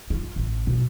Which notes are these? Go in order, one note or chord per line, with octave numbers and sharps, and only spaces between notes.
F4
A1
B2